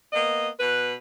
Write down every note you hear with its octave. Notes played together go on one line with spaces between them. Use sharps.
A#3 B3 D#5
B2 B4